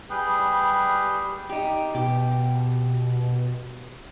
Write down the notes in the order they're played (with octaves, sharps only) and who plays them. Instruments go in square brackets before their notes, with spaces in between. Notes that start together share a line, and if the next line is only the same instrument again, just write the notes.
[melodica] G3 G#4 B4 G5
[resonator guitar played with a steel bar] D#4 G4
[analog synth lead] B2 [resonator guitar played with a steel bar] G4